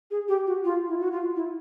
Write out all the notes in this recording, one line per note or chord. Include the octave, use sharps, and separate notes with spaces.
G#4
G4
F#4
F4
E4
F#4
F4
E4